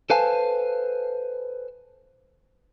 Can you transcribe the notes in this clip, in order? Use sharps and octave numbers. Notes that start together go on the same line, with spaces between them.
A4 B4 C5 F5 G#5 A5